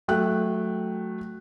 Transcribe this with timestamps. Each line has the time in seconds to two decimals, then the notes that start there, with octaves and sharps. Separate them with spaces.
0.08 F#3 A3 G5 F#6